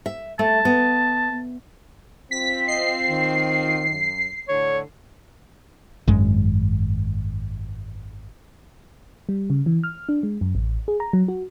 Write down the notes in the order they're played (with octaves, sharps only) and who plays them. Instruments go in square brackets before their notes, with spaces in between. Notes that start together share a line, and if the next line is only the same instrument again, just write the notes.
[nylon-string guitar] E5
[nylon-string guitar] A3 [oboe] A5
[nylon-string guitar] B3
[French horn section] C4 F4 [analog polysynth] B6
[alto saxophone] D#5 [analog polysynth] C7
[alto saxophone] D#3
[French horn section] F#2
[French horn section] A2 D3 [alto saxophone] C#5
[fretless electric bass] G#1 F#2 G#3
[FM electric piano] G3
C#3
E3
F6
D4
G#3
F#2
A1
G#4
A#5
F#3
F#4